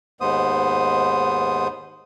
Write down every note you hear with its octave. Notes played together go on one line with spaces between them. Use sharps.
D#2 G#2 B3 C5 D#6